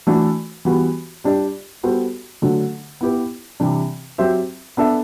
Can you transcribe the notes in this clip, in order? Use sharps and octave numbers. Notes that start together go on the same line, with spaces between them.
E3 A3 D4 F#4 A4
E3 G3 B3 F#4
G3 D4 G4 D5
G3 B3 F#4 A4 C5
D3 F#3 A3
B3 E4 G4 B4
C3 E3 G3 D4
F#3 C4 G4 C5 E5
B3 D4 A4 E5